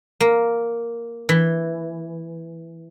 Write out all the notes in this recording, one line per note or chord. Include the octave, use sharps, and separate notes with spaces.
A#3
E3